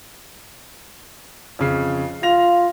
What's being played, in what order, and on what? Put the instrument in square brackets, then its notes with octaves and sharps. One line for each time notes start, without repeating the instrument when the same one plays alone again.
[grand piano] F2 C#3 C7
[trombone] F4 [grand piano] A#6 F7